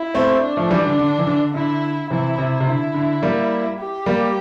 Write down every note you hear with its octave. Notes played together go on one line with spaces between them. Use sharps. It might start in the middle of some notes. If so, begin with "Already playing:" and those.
Already playing: E4
A3 C4
D4
F3 A3
E3 G3
D3
D3
E3
D3
D3 E4
C3 E3 E4
C3
C3
D3 E4
D3
G3 A#3
G4
G3 A#3